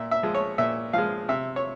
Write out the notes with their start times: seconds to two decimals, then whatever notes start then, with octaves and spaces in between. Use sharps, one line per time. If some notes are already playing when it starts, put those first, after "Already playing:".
Already playing: A#2 E5
0.11 E5
0.23 F3 G#3
0.35 C#5
0.58 A#2 E5
0.93 F3 G#3 F5
1.29 C3 E5
1.56 C#5